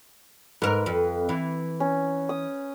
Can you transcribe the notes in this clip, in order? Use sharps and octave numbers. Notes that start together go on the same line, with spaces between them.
G#2 A#4 B4
F2
E3
C#4
D#6